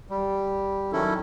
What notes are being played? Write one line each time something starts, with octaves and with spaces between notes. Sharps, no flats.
G3
D#3 F#3 C#4 E4 A4